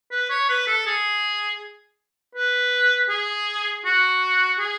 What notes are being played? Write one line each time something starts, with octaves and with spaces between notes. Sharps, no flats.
B4
C#5
B4
A4
G#4
B4
G#4
F#4
G#4